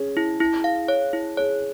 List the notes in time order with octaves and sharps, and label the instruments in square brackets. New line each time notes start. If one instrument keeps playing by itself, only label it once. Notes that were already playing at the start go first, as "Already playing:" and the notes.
Already playing: [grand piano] C#4 G#4
[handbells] E4
E4
F5
C#5
E4
[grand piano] G#4 [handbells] C#5